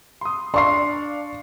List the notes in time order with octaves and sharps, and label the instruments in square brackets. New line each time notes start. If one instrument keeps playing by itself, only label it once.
[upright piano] C6 D#6
[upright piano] D4 F5 [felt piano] C6 C#6 C7